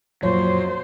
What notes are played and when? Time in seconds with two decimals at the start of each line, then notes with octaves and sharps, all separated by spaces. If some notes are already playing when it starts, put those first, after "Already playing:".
0.23 F#2 A#2 F3 F#3 C5 C#5